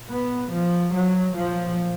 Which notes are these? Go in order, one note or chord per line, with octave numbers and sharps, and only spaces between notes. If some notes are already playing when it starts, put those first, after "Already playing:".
Already playing: A#2
B3
F3
F#3
A#2 F3